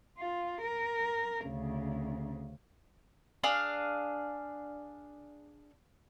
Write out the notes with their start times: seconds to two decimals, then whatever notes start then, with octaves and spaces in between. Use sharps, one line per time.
0.18 F4
0.62 A#4
1.44 D2 C#3
3.44 D4 G#4 F5